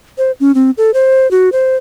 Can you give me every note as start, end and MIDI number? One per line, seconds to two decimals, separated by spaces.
0.18 0.31 72
0.40 0.54 61
0.55 0.71 60
0.78 0.94 69
0.94 1.29 72
1.31 1.49 66
1.52 1.76 72